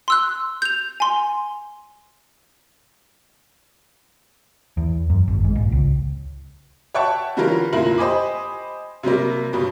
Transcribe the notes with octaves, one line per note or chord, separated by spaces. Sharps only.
C6 E6 F#6
G6 F7
G#5 C6
E2
F#2
G#1
G#2
A#1
C#2
C#5 E5 F#5 G5 A5 C#6
D3 E3 G3 C#4 F4 A#4
F1 A#2 E4 F4 A#4 F#7
G4 C5 D#5 G#5 B5 D6
C3 F#3 G3 A#3
G2 B2 F#3 G3